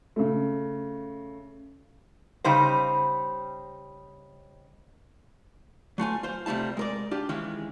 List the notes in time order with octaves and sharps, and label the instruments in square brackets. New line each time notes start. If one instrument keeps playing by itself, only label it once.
[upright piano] C#3 A3
[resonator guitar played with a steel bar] C#3 G3 D#4 C5
[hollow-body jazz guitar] F#3 A3 F4 G#5
F4 C5
C3 G3 A3 F4 A5
G#3 A#4 D5
D4 F4 G4
D#3 E3 G#3 C#4 F4